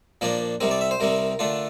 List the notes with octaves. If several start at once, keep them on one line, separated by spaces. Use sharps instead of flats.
A#2 F3 A#3 D4 A#4
C2 C3 G3 C4 A#4
D5
E5
C5
C2 C3 G3 C4 A#4
D3 A3 D4 F4